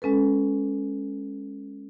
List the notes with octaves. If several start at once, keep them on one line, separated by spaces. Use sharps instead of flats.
G#3 C#4 A4 B4